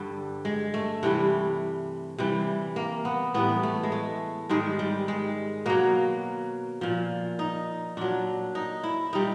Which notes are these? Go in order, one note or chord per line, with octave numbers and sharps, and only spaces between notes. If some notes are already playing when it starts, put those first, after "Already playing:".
Already playing: G2 D3 G3
G#3
A3
C3 E3 G3
C3 E3 G3
A#3
B3
A2 E3 G3 B3
A3
G#3
A3
G#2 D#3 G3 G#3
G3
G#3
B2 F#3 A#3
A#2 F3
D#4
A#2 F#3 D4
D#4
E4
A#2 G3 D#4